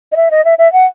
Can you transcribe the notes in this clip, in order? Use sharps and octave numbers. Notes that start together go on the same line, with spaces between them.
D#5
E5
D#5
E5
E5
F#5